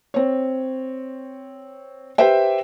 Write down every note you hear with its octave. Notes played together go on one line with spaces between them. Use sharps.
C4 C#5
G4 B4 C5 E5 G5